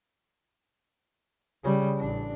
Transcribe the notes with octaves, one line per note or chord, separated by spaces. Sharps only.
C#3 G3
A1 D4